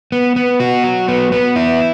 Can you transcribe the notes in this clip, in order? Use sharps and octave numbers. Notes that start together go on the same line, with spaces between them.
B3
B3
F#4
F#3
B3
B3
E4